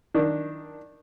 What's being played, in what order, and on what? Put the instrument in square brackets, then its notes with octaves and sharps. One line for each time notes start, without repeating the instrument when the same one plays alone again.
[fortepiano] D#3 D4